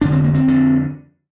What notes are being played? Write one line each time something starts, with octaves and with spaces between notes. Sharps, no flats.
F1 F2 D3 D4
C4
A#3
C4
F2 D3